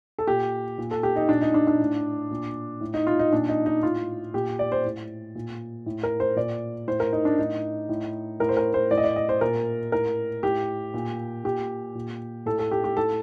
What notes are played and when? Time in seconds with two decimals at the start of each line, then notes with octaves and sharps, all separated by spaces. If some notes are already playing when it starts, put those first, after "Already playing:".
0.19 A4
0.27 A#2 G4
0.78 A#2
0.91 A4
1.03 G4
1.16 D#4
1.29 A#2 D4
1.42 D#4
1.54 D4
1.67 D4
1.79 A2
2.31 A#2
2.81 A2
2.94 D#4
3.07 F4
3.19 D#4
3.32 A#2 D4
3.49 D#4
3.66 D#4
3.83 A2 F4
4.34 A#2 G4
4.59 D5
4.72 C5
4.85 A2
5.35 A#2
5.86 A2
6.03 A#4
6.20 C5
6.36 A#2 D5
6.87 A2 C5
7.00 A#4
7.13 D#4
7.25 D4
7.38 A2 D#4
7.89 A2
8.40 A2 A#4
8.49 C5
8.57 A#4
8.74 C5
8.91 A2 D5
8.97 D#5
9.04 D5
9.16 D#5
9.29 C5
9.41 A#2 A#4
9.92 A2 A#4
10.43 A2 G4
10.94 A#2
11.44 A#2 G4
11.95 A#2
12.46 A2 A4
12.59 A4
12.71 G4
12.84 G4
12.97 A2 A4